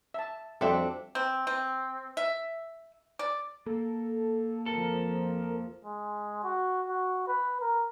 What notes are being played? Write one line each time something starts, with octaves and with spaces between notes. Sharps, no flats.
E5 A5
F2 G3 C4 D4 F#4 A4 E5
C4
C4
E5
D5
A#3 A4
F2 F3 A4 A#4
G#3
F#4
F#4
B4
A#4